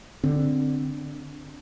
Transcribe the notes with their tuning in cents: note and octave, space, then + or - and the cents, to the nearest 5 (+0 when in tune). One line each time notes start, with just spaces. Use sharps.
D3 +0 C4 -10